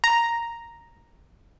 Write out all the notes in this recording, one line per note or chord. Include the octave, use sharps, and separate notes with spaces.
A#5